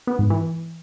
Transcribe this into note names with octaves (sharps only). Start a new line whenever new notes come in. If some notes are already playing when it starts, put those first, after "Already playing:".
B3
G#2
E3